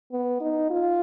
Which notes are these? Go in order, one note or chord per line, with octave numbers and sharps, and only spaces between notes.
B3
D#4
F4